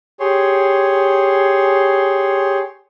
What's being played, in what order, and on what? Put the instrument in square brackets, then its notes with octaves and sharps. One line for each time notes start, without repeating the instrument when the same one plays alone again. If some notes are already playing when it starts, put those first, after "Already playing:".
[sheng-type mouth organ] G4 G#4 C#5 C6